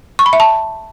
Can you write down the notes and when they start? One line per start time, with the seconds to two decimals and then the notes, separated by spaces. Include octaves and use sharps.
0.19 C#6
0.26 B5
0.33 E5
0.40 A5